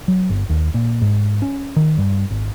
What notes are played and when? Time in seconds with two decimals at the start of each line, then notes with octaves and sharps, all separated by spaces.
0.08 F#3
0.30 G1
0.50 D#2
0.74 A#2
1.02 G#2
1.42 C#4
1.76 D#3
1.98 G2
2.31 G#1